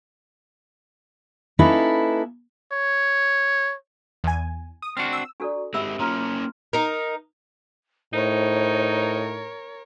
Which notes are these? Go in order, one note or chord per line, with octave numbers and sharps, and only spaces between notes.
A#3 C#4 D#4 E4 A4 B4
C#5
E2 G#5
D#6
C4 D4 F#4 F6
E6
D4 F#4 A4 D5 A#5 C#6
G#3 C4 G4 E5 B5 E6
A#3 C#4 F4 A#5 C6 D#6 F6
D#4 A#4
A2 D#4 A#4 C5 C#5